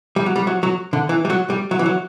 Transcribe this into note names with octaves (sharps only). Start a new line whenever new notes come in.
G3
F#3
G3
F#3
F#3
D3
E3
G3
F#3
G3
F#3
E3
F#3